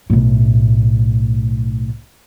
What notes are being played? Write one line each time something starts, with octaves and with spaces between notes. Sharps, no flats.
B1 A2